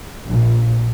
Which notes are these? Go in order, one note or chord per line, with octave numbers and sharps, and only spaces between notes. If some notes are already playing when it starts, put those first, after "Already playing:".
A#1 A#2